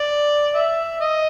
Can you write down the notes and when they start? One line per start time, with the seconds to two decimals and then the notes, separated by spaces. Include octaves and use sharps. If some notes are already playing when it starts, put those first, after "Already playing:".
Already playing: D5
0.55 E5
1.01 D#5